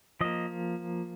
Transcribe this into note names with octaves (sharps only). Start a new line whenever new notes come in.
F3 A#3 D#5